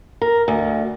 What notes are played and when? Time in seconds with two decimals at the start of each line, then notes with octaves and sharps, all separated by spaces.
0.22 A#4
0.48 D2